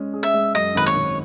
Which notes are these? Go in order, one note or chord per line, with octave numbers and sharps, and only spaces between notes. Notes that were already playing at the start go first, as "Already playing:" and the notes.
Already playing: G#3 C#4 G#4
G#4
E5
G#3
F#2 D#5
G#1 B4
C#5
G#1